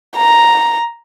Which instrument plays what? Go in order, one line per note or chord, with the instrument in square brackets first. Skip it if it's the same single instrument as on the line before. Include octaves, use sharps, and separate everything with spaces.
[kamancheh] A#5